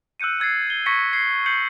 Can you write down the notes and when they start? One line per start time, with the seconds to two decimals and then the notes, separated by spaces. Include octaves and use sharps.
0.20 E6 F#6 G6 C#7 D#7
0.40 E6 G#6 A6 C7
0.67 G#6 G7
0.86 C#6 G#6 A#6 B6 C#7
1.13 G#6 C7
1.46 G6 C7 C#7 F#7